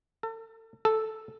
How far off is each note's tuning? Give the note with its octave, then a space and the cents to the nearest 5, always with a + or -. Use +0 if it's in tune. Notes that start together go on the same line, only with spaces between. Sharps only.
A4 +35
A4 -5